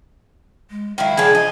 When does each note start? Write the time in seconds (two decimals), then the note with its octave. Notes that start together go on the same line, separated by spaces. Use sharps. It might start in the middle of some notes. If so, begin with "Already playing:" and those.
0.70 G#3
0.98 D#3 F#3 E4 F5
1.17 F3 D4 G#4 G#5
1.35 D#5